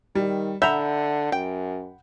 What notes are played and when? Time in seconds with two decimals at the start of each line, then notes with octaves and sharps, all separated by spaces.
0.15 D#3 G3
0.62 D3 E5 F#5 A#5 B5 G6
1.32 F#2 G5